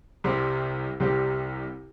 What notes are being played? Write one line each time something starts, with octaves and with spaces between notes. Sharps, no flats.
C2 C3 G3 C4 G4
C2 C3 G3 C4 G4